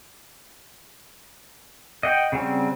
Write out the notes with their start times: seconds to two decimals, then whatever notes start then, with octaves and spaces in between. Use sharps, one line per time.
2.03 D#5 F#5 G5
2.32 C#3 F#3 G3 C4